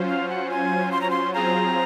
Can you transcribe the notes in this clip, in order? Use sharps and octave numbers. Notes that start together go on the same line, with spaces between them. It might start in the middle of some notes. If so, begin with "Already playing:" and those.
Already playing: F#3 C#4 F4 C5
F5
F#5
G#5
C6
A#5
C6
F#3 C4 F4 G#4 C5 A#5